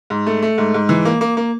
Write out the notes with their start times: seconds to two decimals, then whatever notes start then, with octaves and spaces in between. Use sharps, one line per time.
0.10 G#2
0.26 A3
0.42 A3
0.58 G#2
0.74 G#2
0.89 E3
1.05 A#3
1.21 A#3
1.37 A#3